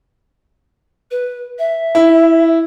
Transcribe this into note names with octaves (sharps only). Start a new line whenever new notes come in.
B4
E5
E4